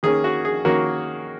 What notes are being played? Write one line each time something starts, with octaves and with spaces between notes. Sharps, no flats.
D#3 A#3 C#4 G#4
F#4
G#4
D#3 A#3 C#4 F#4 A#4